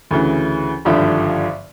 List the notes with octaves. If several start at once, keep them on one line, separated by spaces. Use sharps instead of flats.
D2 C#3 E3
G#1 G2 D3 F3 E5